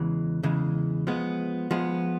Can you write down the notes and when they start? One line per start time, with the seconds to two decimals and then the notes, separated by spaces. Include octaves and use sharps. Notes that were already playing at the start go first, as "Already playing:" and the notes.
Already playing: E2 C#3 E3 G#3
0.43 E2 C#3 E3 G#3
1.07 F3 G#3 B3
1.71 F3 G#3 B3